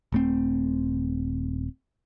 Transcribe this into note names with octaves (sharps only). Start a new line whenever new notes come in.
D#1 A3 C4